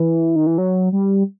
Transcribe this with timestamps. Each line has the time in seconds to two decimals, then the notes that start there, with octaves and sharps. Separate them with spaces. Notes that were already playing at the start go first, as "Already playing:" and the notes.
Already playing: E3
0.36 D#3
0.47 E3
0.58 F#3
0.92 G3